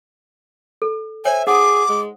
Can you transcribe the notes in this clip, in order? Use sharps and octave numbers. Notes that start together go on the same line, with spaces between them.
A4
C5 C#5 E5 G5 G#5
D#4 G#4 F#5 D6 D#6
G#3